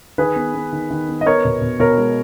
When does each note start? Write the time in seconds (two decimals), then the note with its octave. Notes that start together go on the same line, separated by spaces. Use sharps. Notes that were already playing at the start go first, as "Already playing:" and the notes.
0.18 D#3 G#4 B4
0.36 B3
0.54 B3
0.72 D#3
0.90 D#3
1.09 B3
1.21 D#5
1.26 B3 A#4 C#5
1.45 B2
1.62 B2
1.80 B2 A#4 C#5
1.98 G#3